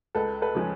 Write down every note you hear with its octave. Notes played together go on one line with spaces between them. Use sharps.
C#2 A4 B4
A4 B4
C#3 F3 G#3 C#4